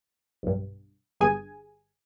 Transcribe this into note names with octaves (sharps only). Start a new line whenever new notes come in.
B1 G2
G1 G2 G#4 G#5